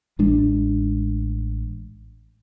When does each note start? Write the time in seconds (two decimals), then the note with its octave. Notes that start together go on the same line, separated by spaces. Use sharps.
0.19 A1 G#3 D4